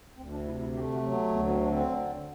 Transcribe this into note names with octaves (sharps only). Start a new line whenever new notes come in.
D2 C4
D4
C3 E4
E4
A3 G4
F#4
F#3
B3
D2 B3
B3
C4
D3 D4
C4